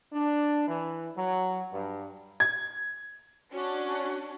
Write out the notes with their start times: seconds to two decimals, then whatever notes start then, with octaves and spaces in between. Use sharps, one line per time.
0.13 D4
0.68 E3
1.18 F#3
1.72 G2
2.40 G#6
3.53 C#4 D4 F#4